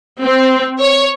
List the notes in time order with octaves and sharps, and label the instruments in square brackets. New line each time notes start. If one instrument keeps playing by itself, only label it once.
[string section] C4
C#5